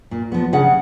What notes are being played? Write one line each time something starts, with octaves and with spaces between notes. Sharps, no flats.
A#2
F3 B3
C#3 F#5